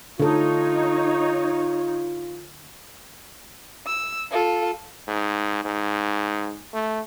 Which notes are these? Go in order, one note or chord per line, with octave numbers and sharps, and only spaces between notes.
D3 D#4 F4 A4 C#5
E6
F4 A4
G#2
G#2
A3